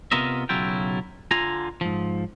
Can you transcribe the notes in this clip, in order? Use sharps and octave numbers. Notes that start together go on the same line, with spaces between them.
C3 B3 F4 A#4 D#5 E5
B1 C#3 F#3 E4 F4 G5
D3 F4 G#5 A#5
G#2 F3